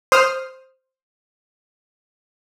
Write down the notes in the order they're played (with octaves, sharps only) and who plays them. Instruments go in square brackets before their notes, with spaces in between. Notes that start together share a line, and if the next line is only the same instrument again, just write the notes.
[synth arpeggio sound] C5 D#6 F6